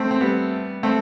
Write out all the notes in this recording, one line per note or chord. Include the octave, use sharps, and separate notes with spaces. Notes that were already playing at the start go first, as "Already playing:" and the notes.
Already playing: A3 C4
C4
G3 B3
A3 C4